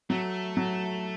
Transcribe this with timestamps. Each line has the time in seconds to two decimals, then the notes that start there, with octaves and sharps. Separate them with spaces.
0.10 F#3 A3
0.57 F#3